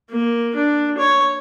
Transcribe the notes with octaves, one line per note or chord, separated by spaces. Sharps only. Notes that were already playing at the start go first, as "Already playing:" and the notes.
A#3
D4
C#5